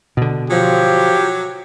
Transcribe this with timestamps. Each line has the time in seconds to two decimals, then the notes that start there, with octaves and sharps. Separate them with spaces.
0.17 B2 D3
0.50 F3 F#3 G4